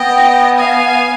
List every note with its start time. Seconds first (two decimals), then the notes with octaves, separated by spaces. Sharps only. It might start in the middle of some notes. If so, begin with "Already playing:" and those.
Already playing: B3 D#5 G5
0.56 F5 G#5